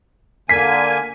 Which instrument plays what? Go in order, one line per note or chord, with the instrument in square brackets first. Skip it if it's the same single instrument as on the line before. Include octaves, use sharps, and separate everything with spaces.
[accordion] D3 A#3 G#5 [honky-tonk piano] B6